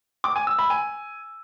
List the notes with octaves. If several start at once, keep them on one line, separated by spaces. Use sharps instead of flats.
D6
G#5
E6
B5
G#5